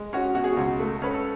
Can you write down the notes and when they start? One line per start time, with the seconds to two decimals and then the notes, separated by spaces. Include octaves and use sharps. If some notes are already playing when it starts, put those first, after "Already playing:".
Already playing: G#3
0.13 C#4 F#4
0.35 B2 F#4
0.44 G#4
0.53 C#2 F#4
0.79 A3
1.02 C#4 B4
1.14 A4